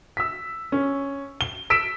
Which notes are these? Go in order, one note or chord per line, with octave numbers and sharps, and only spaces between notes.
E6 B6
C#4
G7
E6 B6 D7 E7